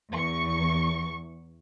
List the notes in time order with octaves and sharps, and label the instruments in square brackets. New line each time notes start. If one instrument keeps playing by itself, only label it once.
[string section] E2 C#6